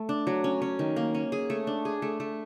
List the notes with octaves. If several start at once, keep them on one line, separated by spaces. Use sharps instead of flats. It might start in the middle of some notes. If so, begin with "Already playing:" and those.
Already playing: A3
D4
F#3
C#4
C#4
D#3
A#3
C#4
G#4
A3
D4
G#4
A3
A3